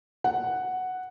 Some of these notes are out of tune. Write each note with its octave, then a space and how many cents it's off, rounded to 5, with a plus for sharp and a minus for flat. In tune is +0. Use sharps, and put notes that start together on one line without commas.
F#5 +0